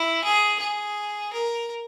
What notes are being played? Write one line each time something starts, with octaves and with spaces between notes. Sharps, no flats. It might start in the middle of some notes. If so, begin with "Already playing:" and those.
Already playing: E4
G#4
G#4
A#4